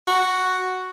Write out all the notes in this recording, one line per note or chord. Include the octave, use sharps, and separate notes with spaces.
F#4